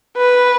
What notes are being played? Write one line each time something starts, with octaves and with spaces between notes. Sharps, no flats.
B4